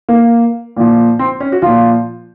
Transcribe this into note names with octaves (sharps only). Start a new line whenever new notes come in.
A#3
A#2 F3
C4
C#4
F#4
A#2 F3 F4